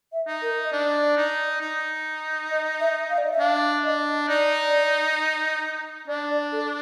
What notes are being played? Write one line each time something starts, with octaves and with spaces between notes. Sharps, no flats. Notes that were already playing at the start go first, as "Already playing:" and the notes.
E5
D#4
A#4
D#5
D4 D5
D#4
D#4
D#5
E5
F5
D5
D#5
E5
D4 F5
D4 D#5
D#4 D5
D4 D5
D5
A4